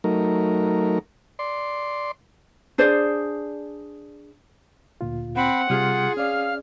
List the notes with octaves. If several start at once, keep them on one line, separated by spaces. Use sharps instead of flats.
F#3 A3 D#4 A#4
D5 C6
D4 G#4 C5 D5
D2 A#2 F4
C4 F#5 B5
C3 G3 F4 G#4 F6
C#4 D5 F5 F6